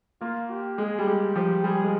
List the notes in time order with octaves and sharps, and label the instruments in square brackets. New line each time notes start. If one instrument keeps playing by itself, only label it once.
[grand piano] A#3 [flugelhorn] F4
[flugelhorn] G4
[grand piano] G#3 [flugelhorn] G#4
[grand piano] G3
[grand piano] G#3 [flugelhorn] G4
[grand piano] F3 [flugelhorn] G4
[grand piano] G3 [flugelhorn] G#4
[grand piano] G#3